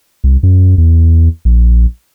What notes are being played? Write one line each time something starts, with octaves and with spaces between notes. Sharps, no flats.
C2
F#2
E2
A#1